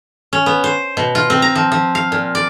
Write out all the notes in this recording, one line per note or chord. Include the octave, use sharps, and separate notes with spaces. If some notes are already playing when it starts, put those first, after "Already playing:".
C#4
B3
C5
B2
F4
C4
A#5
F3
F3
F5
A#2
D5